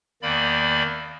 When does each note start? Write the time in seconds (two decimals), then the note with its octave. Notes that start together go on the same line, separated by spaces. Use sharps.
0.22 E2 D#3 A#3 D5 B5